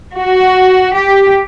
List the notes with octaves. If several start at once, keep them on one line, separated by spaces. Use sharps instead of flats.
F#4
G4